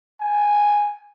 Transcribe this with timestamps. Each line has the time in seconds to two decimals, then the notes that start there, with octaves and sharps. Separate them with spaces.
0.20 G#5